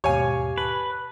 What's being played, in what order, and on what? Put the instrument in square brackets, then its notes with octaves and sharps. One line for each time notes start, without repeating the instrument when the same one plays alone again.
[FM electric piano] D#2 G#2 B2 [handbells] G4 F5 [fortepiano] C#5 G#5
[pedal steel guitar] B4 [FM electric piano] A5